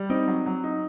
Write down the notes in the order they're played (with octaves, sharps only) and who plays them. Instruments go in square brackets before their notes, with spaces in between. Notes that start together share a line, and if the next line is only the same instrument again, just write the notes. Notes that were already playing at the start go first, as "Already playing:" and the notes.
Already playing: [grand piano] G3
[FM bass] C4 [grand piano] D#4
[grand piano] F#3
F#3
D#4